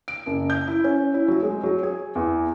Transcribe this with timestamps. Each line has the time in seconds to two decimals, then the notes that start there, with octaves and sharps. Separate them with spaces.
0.08 D7
0.26 F#1
0.50 G6
0.67 E4
0.84 C#4
1.14 E4
1.28 F#3
1.43 G#3
1.63 F#3
1.83 G#4
2.15 E2